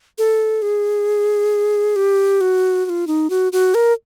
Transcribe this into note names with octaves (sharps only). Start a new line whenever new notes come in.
A4
G#4
G4
F#4
F#4
F4
D#4
F#4
F#4
A#4